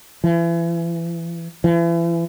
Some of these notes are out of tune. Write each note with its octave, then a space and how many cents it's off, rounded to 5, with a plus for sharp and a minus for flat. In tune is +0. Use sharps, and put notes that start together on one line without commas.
E3 +35
E3 +40